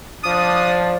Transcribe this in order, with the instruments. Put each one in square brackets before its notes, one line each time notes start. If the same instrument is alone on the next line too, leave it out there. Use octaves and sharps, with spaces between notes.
[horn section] F3 D4 [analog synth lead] D#6